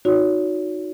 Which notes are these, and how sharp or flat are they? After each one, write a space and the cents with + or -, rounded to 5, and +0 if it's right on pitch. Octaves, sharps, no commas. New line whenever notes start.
D#4 +0 F#4 -20 C#5 +35